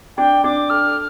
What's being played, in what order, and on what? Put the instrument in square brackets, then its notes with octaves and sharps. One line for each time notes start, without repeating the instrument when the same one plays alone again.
[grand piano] D4 [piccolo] G5
[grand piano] D4 [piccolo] D6
[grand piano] A4 [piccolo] F6